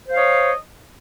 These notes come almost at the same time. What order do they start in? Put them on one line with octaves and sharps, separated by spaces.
C5 F5 C#5 D#5